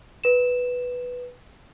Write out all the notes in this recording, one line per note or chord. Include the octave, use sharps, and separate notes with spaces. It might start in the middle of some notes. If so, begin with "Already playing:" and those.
B4 E7